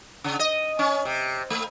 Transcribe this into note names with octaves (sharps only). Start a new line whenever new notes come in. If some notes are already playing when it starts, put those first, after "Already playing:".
C#3
D#5
C#4
C3
A3